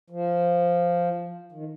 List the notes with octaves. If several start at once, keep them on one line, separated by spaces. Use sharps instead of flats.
F3
D#3